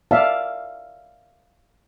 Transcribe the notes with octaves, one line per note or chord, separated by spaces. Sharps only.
D5 E5 F5 A5